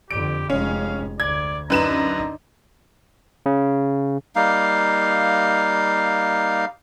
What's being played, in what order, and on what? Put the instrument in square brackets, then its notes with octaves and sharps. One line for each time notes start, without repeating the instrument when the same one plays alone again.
[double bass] F2 D3 [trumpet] G4 [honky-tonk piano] D7
[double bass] F1 G#3 [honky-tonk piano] C#4 [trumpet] F5
[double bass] D2 [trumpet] D5 [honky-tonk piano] G#6
[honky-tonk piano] F#2 B4 E7 [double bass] D4 D#4 [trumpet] A#5
[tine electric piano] C#3
[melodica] G3 A#3 D#4 F5